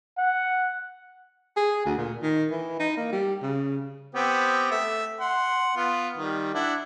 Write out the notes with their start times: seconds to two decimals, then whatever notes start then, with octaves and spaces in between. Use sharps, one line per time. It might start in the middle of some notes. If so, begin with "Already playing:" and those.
0.18 F#5
1.56 G#4
1.85 D2
1.98 A#2
2.23 D#3
2.51 E3
2.79 D#4
2.97 A#3
3.12 G3
3.43 C#3
4.15 B3 C4 G4
4.71 A3 E5
5.20 F#5 C6
5.76 B3 F4
6.18 D#3 G3
6.54 D4 E4 F#5